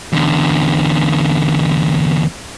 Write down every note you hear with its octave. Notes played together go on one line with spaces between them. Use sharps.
E2 D3